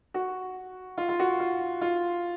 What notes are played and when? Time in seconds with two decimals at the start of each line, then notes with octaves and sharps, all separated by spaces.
0.14 F#4
0.98 F4
1.09 F4
1.20 F#4
1.40 F4
1.81 F4